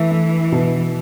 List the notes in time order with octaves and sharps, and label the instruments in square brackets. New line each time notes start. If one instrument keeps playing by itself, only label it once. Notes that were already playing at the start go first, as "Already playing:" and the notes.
Already playing: [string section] E3 [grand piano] A3
[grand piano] A3
B2